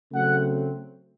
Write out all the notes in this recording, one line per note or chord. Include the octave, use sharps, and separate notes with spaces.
C#3 F#3 A3 C4 F#5